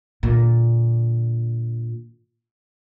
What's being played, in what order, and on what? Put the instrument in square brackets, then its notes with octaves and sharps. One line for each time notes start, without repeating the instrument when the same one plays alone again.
[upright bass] A#2 D3